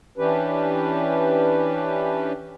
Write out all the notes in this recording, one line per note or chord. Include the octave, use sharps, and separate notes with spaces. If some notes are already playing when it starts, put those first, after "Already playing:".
E3 C#4 D4 G4 B4